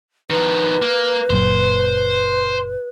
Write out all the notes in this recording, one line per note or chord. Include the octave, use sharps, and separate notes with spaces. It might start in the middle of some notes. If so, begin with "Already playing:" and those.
D#3 F3 B4
A#3
F#1 A#2 F#3 C5